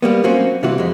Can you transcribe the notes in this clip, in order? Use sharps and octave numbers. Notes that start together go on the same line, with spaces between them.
G3 A#3 B3
F#3 A#3 C4 C#4 F#4
C3 E3 G3 F4 F#4
F2 G#3